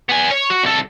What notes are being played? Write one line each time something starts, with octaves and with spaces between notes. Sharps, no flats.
B3 G#5
C#5
F#4
C2 A4